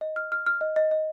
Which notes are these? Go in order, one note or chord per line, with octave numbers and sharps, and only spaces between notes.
D#5
F6
F6
F6
D#5
D#5
D#5